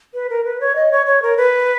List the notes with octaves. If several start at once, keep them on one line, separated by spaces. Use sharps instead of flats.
B4
A#4
B4
C#5
D#5
C#5
C#5
A#4
B4